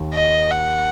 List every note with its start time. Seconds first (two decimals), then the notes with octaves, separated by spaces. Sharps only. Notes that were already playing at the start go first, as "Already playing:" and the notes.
Already playing: D#2 D#3
0.14 D#5
0.51 F#5